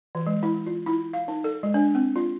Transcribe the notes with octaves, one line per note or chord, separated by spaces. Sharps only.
E3
G#3
E4
F4
E4
F5
D#4
A4
G#3
D4
C4
F4